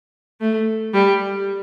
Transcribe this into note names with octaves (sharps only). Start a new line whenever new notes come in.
A3
G3